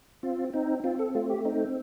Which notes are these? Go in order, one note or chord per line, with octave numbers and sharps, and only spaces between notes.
C4 F4
C4 D#4
C4 F4
A4
A3 F4
G4
C4 D#4